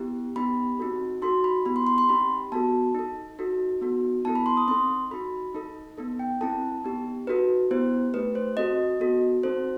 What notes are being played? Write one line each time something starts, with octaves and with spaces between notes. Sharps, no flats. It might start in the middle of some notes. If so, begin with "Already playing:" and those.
Already playing: B3 E4 G4
B3 D#4 G4 B5
C4 D#4 F#4 A4
D#4 F#4 A4 C6
B5
B3 E4 G4 B5
C6
C6
C6
C4 D#4 G4 B5
B3 F#4 A4 A5
D#4 A4
D#4 F#4 A4
B3 D#4 F#4 A4
B3 E4 A4 A5
B5
C6
D#6
C4 D#4 A4 C6
D#4 F#4 A4 B5
D#4 A4
B3 D#4 A4
G5
C4 E4 A4 A5
B3 D#4 G4
D#4 F#4 A4 B4
B3 E4 G4 C5
A3 D#4 G4 B4
C5
C4 F#4 A4 D#5
B3 F#4 A4
C4 D#4 F#4 A4 C5